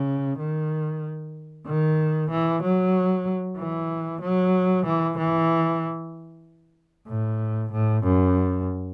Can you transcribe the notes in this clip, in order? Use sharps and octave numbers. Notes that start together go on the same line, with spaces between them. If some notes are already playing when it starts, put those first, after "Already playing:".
Already playing: C#3
D#3
D#3
E3
F#3
E3
F#3
E3
E3
A2
A2
F#2